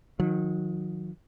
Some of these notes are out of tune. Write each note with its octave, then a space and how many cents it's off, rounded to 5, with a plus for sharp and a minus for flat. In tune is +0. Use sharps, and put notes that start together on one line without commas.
D#3 +0 F#3 -35